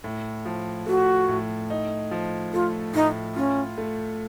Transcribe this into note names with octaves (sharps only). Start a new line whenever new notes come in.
A2
F3
A3 F#4
A2
D#4
F3
A3 F4
A2 D#4
C#4 F4
A3